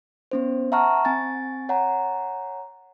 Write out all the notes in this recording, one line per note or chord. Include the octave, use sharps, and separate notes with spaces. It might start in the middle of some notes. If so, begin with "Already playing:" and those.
B3 C#4 C5
E5 F#5 A5 A#5 C#6 F6
C4 G#5 A6
C#5 F#5 G#5 A#5